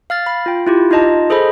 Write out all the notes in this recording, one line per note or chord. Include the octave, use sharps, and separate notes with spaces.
F5 F6 A6
F5 B5
F4 G5
E4 F4 G4
D#4 F4 D#5 A5
G#4 A4 C5 D#5 B5